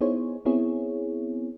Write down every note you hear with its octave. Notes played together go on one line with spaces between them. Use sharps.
B3 D#4 E4 G#4 C5 C#5
B3 C4 E4 G#4 C#5